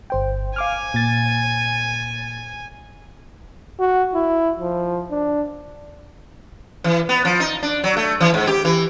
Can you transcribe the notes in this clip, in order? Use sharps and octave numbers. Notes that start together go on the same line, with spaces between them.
G1 C5 G5
F5 G#5 D6 F6
A#2 A6
F#4
E4
F3
D4
E3
B3
F3
D#4
D4
F#3
A3
E3
G#2
G4
E3